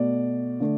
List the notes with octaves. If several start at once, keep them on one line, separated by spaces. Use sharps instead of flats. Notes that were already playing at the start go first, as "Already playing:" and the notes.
Already playing: B2 A3 D5
D3 A3